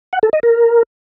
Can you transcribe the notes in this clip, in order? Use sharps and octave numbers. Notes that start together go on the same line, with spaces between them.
F#5
A4
D#5
A#4